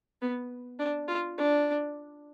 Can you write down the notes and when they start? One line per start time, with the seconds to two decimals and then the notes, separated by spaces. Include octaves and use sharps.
0.22 B3
0.79 D4
1.08 F4
1.38 D4